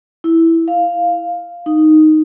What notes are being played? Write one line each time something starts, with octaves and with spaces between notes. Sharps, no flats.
E4
F5
D#4